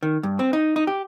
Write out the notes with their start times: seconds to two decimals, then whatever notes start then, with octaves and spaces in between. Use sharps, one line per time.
0.03 D#3
0.23 G2
0.39 C4
0.53 D#4
0.76 D#4
0.87 G4